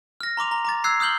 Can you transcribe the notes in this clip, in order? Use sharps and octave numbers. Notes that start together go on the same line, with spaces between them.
F6 A#6
A#5 C6 D6 F7
A#5
A#5 D6 A6
E6 F#6 G#6 C7
D#6 F6 G6 F#7 G7